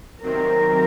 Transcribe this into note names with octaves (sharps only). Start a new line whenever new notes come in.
C3 D#3 F#3 C4 A#4